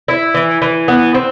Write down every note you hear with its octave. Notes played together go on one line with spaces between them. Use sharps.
E4
E3
E3
B3
C4